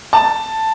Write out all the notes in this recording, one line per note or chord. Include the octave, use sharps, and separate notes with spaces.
A5